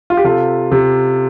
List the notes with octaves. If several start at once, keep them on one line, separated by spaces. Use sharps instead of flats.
F4
G4
C3 F4 A4
C3